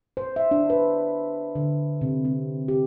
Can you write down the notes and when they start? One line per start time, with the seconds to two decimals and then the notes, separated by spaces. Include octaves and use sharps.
0.17 C5
0.36 E5
0.51 D4
0.70 B4
1.55 D3
2.01 C3
2.25 C4
2.68 G4